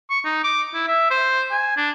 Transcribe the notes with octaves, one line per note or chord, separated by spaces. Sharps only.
C#6
D#4
D6
E4
E5
C5
G#5
D4